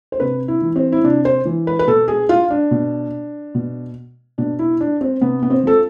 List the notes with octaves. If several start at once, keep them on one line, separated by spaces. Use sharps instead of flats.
C5
C3 B4
E4
E3
C4
E4
C3 D4
C5
E3
B4
B4
B2 A4
G#4
F4
D4
B2
B2
B2 D4
E4
D4
C4
C3 B3
B3
C4
F3 A4